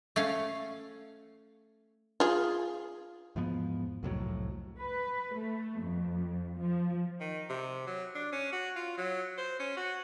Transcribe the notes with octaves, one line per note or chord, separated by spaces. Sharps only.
A3 C#4 F5
F4 G#4
E2 G#2 F3 B3
C2 F2 A2 F#3
B4
A3
F2
F3
D#3
C3
F#3
D4
C#4
F#4
F4
F#3
C5
C#4
F#4